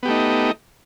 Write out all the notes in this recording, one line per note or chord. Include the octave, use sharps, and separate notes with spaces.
A3 B3 D#4 G4